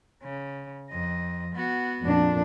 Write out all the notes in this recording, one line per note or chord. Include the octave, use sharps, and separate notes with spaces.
C#3
F2 D#5
B3 F#4
F2 A#2 D4